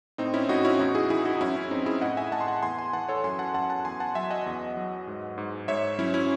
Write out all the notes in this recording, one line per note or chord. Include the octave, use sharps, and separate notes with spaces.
A2 C4 D#4
C#4 E4
A2 D#4 F#4
C#4 E4
E2 D#4 F#4
E4 G#4
E3 E4 G#4
D#4 F#4
D#4
F#2 C#4 E4
C#4
F#2 C4 D#4
E4 G#4
A2 D#5 F#5
E5 G#5
A2 F#5 A5
C6
F#5 A5
E2 G#5 C6
G#5 C6
E3 F#5 A5
A4 C#5
F#2 G#5 C6
F#5 A5
F#2 F#5 A5
F#5 A5
E2 G#5 C6
F#5 A5
F#3 E5 G#5
D#5 F#5
E2
F#3
G#2
G#2
G#2 C#5 E5
F#3 C#4 E4
C#4 E4